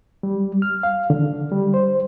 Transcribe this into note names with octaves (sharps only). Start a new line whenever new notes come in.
G3
F6
F5
D3
G3
C5